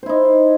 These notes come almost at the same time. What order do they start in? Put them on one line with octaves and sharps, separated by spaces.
C5 E4 D#4